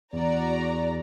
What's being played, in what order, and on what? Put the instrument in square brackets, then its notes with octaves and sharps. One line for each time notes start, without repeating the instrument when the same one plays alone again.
[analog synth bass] E2 [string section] F#4 D5 A#5